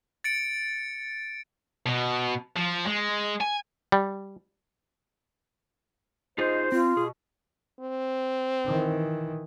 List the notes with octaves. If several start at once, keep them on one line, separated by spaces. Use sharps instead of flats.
A6 C#7 D7
B2
F3
G#3
G#5
G3
D#4 F4 G#4 C5 D#5
C4 F4
B2 G#4
C4
D#3 E3